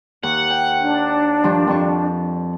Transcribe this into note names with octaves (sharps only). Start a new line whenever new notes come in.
D#2 F#5
G5
D4
G2 D#3 F3
F2 F3 C#6